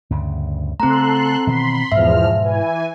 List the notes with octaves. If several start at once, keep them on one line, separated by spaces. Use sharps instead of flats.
D2 G2 C#3
C#3 A3 C4 A4 A#5 C6 F#6
B2 D#3 E3 B5 C6
E2 G#2 B2 F3 E5 F6
E3 G#5